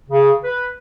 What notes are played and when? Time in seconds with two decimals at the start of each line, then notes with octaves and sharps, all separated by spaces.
0.10 C#3
0.43 B4